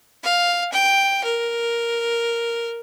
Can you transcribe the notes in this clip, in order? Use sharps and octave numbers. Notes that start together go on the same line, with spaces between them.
F5
G5
A#4